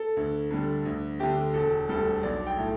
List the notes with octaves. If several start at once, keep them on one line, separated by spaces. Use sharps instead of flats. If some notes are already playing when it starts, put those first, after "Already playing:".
Already playing: A4
D2
D3 G3
D2
D3 A3 G4
E1 A4
D2 D3 G3 A4
B1 D5
G5
A2 A3